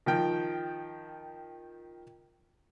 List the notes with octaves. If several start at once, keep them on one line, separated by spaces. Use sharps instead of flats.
D#3 F3 G5